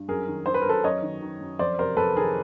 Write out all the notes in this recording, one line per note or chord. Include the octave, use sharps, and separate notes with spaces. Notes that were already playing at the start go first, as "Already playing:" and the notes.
Already playing: G2
F#2 G#4 A#4
D#3
D#3 C5
B4
A#4
F#2 A4 B4
F#2 C#5 D#5
D#3
D#3
F#2
F2 C5 D5
C3 A#4 C5
F2 A4 B4
D#3 G#4 A#4